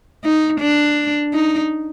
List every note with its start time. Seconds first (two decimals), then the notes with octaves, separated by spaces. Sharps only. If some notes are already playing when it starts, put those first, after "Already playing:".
0.24 D#4
0.60 D4
1.33 D#4